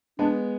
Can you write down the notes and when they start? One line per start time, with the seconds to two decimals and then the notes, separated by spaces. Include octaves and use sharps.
0.19 G#3 B3 D4